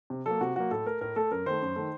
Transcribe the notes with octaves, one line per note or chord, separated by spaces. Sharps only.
C3
F#3 A#3 A4
C3 F#4
F#3 A#3 F#4
A2 A4
A3 A#4
A2 A#4
A3 A4
F#2 A#4
D#3 A3 C5
F#2
D#3 A3